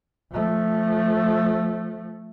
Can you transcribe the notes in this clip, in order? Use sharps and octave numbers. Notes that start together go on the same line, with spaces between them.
F3 A3